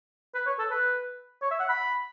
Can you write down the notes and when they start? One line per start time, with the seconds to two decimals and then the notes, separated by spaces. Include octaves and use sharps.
0.35 B4
0.47 C#5
0.59 A4
0.71 B4
1.42 C#5
1.51 E5
1.60 F#5
1.69 B5